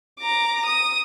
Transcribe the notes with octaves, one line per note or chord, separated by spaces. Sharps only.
A#5 D6
D#6